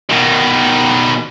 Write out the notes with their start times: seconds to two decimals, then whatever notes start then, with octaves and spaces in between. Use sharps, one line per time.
0.10 B2 D#3